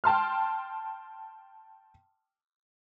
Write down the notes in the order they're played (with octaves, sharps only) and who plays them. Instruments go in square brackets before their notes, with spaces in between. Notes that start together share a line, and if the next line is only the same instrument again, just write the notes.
[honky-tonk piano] G5 A5 C6 F6